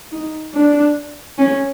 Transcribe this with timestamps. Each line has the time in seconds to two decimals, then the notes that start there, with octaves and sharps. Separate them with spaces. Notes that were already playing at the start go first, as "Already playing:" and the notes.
0.12 D#4
0.54 D4
1.39 C#4